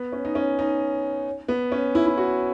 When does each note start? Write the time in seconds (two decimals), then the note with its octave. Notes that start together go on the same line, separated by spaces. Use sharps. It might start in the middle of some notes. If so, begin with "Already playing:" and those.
Already playing: B3
0.12 C#4
0.25 D#4
0.35 C#4
0.59 D#4
1.48 B3
1.72 C#4
1.95 E4
2.06 E4
2.17 F#4